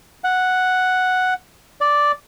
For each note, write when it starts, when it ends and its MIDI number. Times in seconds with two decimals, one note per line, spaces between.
0.24 1.34 78
1.81 2.12 74